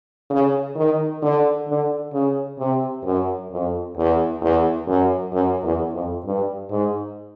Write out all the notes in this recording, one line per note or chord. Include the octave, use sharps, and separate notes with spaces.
C#3
D#3
D3
D3
C#3
C3
F#2
F2
E2
E2
F#2
F#2
E2
F2
G2
G#2